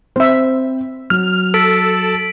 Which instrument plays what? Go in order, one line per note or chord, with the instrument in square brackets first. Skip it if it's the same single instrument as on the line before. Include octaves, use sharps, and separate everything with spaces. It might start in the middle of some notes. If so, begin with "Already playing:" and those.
[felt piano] C4 [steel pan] C5 E5
[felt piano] F#3 [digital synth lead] F6
[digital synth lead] A4 [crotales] E6 B6 D7